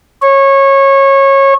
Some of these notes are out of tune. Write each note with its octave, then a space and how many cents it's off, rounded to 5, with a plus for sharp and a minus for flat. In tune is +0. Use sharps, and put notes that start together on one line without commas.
C#5 -20